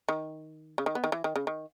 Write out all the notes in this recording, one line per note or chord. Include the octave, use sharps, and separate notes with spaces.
D#3
C#3
D#3
B3
D#3
E3
D#3
C#3
D#3